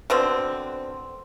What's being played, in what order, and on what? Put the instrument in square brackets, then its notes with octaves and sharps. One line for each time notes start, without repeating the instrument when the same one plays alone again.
[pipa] B2 D3 C4